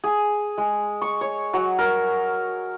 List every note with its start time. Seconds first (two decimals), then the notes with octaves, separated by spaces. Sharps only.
0.04 G#4
0.58 G#3
1.02 C#6
1.21 C#5
1.53 F#3
1.79 A#4